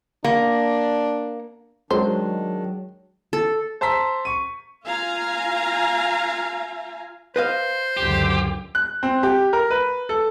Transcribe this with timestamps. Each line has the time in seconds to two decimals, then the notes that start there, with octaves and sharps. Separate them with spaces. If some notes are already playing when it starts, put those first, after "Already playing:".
0.24 A#3 D4
1.91 D#3 F#3 G#3 D4 C5
3.33 A4
3.81 C5 A5 A#5 E6 B6
4.25 C#6 D#7
4.85 F4 F5 G#5 A#5
7.36 B4 C5 D#5 F5
7.97 C#2 F#2 D3 G4
8.75 F#6
9.03 C4
9.23 G4
9.53 A#4
9.70 B4
10.09 A4